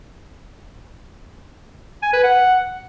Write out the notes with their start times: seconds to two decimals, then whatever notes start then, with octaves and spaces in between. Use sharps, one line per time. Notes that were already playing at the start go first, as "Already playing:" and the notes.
2.02 G#5
2.13 B4
2.24 F#5